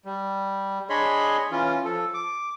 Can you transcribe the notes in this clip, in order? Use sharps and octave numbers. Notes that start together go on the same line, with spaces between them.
G3
D4 G#4 C#5 D#5 B5 C6
E3 C#4 F4
F3 A4
D6